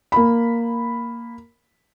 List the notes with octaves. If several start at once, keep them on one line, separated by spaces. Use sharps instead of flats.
A#3 B5